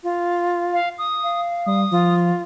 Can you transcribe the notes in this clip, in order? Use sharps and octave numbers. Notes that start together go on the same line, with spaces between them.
F4
F5
D#6
F5
G3 D#6
F3 F4